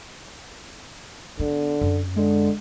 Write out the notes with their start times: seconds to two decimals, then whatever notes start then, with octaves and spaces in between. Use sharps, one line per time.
1.39 D3 B3
1.81 F#2
2.16 D3 G#3